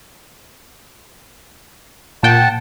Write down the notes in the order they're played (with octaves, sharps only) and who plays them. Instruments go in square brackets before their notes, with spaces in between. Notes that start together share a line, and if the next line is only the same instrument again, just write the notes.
[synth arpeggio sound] A#2 G5 [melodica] F#5 A5